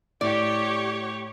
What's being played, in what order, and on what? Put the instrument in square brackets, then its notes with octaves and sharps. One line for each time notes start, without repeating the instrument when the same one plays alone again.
[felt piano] A2 [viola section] G4 C#5 [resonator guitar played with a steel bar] D5